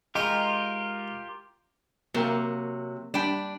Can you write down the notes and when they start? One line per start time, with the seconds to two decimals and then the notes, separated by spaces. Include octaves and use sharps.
0.15 G#3 D#4 F4 G4 A#4 C#6
2.14 C3 F#3 A#3 A#4 G5
3.14 G3 D4 G5 B5